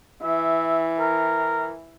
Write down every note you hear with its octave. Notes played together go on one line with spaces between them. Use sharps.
E3 E5
A#4